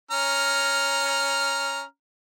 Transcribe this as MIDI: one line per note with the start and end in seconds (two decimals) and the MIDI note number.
0.11 1.83 61
0.11 1.83 82
0.11 1.83 89